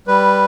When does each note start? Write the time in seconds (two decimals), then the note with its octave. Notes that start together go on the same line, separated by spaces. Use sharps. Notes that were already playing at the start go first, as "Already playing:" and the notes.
0.07 G3 B4